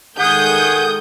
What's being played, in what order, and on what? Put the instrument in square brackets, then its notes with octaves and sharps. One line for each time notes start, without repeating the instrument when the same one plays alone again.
[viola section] D#3 G#3 A4 [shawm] G#4 [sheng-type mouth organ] F#5 [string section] D#6 G6